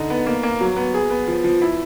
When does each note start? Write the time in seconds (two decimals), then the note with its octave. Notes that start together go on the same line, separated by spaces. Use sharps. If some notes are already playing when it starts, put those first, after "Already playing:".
Already playing: D3 D#4
0.10 B3
0.26 A#3
0.43 A#3
0.61 F#3
0.76 B3
0.94 G#4
1.10 B3
1.28 F3
1.44 F3
1.62 E4